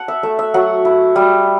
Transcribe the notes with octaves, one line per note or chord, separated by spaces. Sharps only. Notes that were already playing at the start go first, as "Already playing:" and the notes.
Already playing: F#5 A5
E5
A3 E5
E5
F#3 F#5
E4
G3